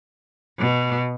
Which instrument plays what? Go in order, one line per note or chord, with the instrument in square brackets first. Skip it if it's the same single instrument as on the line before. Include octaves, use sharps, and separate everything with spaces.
[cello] B2